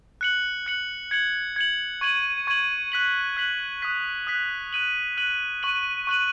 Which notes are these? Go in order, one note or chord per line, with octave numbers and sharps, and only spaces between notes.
F#6 C#7 F#7
F#6 C#7 F#7
G#6 C#7 F#7
G#6 C#7 F#7
C#6 G#6 D#7 F#7
C#6 G#6 D#7 F#7
F#6 B6 F#7
F#6 B6 F#7
D#6 F#6 B6
D#6 F#6 B6
F#6 D#7 F#7
F#6 D#7 F#7
C#6 F#6 D#7 F#7
C#6 F#6 D#7 F#7